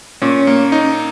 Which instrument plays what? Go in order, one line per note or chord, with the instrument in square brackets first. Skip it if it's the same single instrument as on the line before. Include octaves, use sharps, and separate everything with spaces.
[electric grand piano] A#2 [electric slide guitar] C#4
[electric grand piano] A#3
D#4